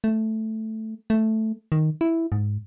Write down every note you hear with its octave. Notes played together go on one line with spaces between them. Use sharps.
A3
A3
D#3
E4
G#2